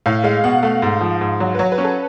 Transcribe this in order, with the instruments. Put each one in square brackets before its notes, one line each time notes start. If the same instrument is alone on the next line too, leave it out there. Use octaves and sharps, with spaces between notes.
[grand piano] A2 [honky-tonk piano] F5
[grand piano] G#3 [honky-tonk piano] F5
[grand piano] B2 [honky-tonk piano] F#5
[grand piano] A3 [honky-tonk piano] F5
[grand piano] G#2
F3
G#2
F#3
[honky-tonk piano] B4
[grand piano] F#3 [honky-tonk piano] C#5
[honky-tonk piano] B4
[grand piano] C#4
[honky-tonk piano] A4